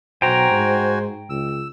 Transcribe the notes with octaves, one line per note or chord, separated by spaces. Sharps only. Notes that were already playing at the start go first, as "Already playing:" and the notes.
B1 F#4 C5 G5 G#5 A#5
G#2
C#2 E6